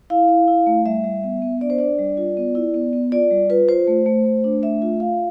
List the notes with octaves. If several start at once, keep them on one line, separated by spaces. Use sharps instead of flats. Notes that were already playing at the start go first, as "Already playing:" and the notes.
E4 F5
E4
E4
A3
G3 E5
G3
B3
B3
D4 D5
C5
D4 D5
G3
F4
B3
E4
B3
B3
F4 D5
G3
F4 B4
F4 C5
A3
A3
A3
D4
A3 E5
F4
F4 F5